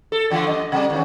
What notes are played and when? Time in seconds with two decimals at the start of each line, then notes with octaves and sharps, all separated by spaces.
0.12 A4
0.30 D3 E3 A3
0.47 F#2 D#5
0.72 C3 G3
0.90 E2 D#3 C#4